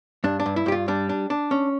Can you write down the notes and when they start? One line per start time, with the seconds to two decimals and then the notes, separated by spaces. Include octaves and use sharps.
0.24 G2 D4
0.40 D4
0.46 G2
0.56 E4
0.66 G2 G4
0.72 F4
0.88 G3 D4
1.09 D4
1.30 D4
1.51 C#4